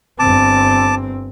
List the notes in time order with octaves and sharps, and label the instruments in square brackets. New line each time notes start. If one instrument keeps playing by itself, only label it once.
[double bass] G1 C4 [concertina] A5 D6